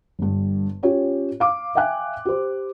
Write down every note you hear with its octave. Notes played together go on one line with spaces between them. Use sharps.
G1 G2
C#4 F4 G4 C#5
F5 D6
E5 F5 G5 G#5 F#6
G4 C5